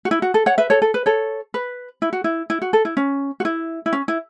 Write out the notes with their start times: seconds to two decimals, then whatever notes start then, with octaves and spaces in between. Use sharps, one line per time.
0.05 F#4
0.11 E4
0.22 F#4
0.34 A4
0.46 C#5 F#5
0.58 B4 E5
0.70 A4 C#5
0.82 A4
0.94 B4
1.06 A4 C#5
1.54 B4
2.02 E4
2.13 F#4
2.24 E4
2.50 E4
2.62 F#4
2.73 A4
2.85 E4
2.97 C#4
3.40 F#4
3.45 E4
3.86 E4
3.93 C#4
4.08 E4